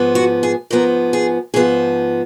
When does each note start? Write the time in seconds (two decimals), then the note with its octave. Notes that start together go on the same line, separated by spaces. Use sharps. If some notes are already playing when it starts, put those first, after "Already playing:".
Already playing: G#2 F3 B3
0.15 F#4
0.43 G#4
0.70 G#2 F3 B3 A#4
1.13 G#4
1.54 G#2 F3 B3 G#4